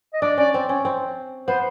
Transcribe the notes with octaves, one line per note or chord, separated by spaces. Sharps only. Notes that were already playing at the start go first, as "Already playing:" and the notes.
D#5
D4 D5
C#4 D5
C4
C#4
C4
B3 C5